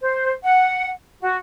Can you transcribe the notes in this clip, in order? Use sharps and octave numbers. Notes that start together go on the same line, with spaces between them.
C5
F#5
F#4